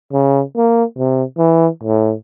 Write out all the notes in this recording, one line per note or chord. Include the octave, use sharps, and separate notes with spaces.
C#3
A#3
C3
E3
A2